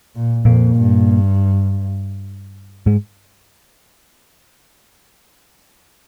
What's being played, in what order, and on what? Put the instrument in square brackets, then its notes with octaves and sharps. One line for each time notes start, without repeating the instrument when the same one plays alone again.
[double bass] A#2
[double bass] F2 [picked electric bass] A#2 A#3
[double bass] G2
[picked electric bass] G#2 G#3